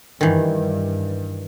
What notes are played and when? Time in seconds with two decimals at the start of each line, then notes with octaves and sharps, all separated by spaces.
0.21 G2 D#3 E3